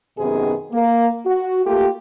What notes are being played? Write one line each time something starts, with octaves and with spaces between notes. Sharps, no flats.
F#2 C3 D#3 B3 D#4 G#4
A#3
F#4
A3 A#3 F4 G4